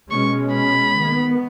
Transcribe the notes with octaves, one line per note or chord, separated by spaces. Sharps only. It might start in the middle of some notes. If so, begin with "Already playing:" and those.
B2 G#3 C#4 C#6
B5
D#3 B3